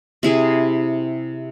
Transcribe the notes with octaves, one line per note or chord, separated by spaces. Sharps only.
C3 E4 G#4